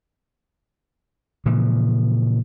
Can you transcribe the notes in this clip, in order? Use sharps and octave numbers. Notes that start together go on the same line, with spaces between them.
A#2 C#3 E3 F3